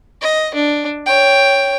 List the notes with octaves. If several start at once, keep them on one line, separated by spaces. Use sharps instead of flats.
D#5
D4
C#5 G5